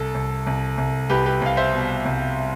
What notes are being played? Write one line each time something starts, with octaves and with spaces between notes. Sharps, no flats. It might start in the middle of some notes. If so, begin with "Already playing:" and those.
Already playing: C2 A4
C2
C2
C2
C2 G4 B4
G4 B4
C2 F5
C5 E5
B2
C2